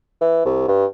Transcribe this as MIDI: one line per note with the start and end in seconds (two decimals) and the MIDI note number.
0.21 0.44 52
0.45 0.68 36
0.68 0.85 43